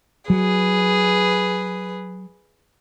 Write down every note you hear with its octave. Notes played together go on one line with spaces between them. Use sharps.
F#3 G#4 B4